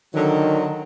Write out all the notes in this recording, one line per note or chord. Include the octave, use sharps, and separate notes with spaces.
D3 D#3 F#3